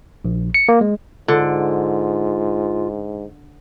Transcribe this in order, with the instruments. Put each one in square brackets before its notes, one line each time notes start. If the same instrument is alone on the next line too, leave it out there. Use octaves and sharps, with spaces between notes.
[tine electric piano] A#1
C#7
A#3
G#3
[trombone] G#2 [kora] D3 [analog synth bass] F4